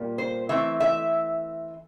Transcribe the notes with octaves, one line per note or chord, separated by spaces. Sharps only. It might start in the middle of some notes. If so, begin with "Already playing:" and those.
Already playing: A#2 G3 A#3
C5
E3 A3 C4 E5
E5